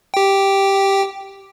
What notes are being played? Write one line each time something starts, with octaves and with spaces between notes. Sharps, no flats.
G4 G5